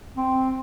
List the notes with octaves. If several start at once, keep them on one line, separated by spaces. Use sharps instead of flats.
C4